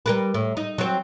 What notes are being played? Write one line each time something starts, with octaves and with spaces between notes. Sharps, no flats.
G3 A#4 B4
A2
D#4
F#3 C4